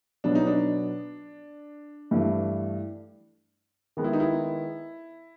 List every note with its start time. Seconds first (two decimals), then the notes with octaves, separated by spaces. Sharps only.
0.24 B2 F#3 B3 D4
0.35 D#4
0.47 D4
2.11 G2 E3 A3
3.97 D#3 G#3 B3
4.04 E4
4.13 D#4
4.20 E4